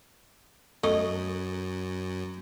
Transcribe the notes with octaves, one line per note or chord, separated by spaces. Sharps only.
F#2 A3 D#5